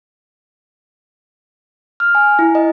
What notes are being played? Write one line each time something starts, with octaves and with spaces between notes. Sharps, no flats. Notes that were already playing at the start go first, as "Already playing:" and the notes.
F6
G#5
E4
D#5